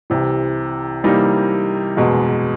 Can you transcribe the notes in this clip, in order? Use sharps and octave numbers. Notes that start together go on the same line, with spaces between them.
C2 C3 E3
C3 E3 G3 A#3 D#4
F#1 E2 B2 G#3